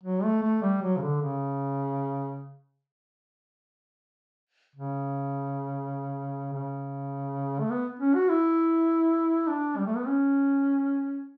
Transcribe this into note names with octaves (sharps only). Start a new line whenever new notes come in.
F#3
A3
A3
G3
F#3
C#3
D3
C#3
C#3
C#3
A3
B3
C#4
F#4
E4
D4
G3
A3
B3
C#4